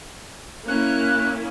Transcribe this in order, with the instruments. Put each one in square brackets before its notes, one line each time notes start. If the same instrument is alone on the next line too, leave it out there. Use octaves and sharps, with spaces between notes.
[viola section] A#3 C#4 E4 [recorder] F#6